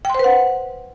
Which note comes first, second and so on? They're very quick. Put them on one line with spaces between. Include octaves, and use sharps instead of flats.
G5 C6 C5 B4 F#5